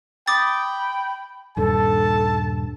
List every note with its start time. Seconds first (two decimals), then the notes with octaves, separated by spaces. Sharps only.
0.28 G5 B5 D6 D#6 A6
1.57 D#1 G2 A4 A5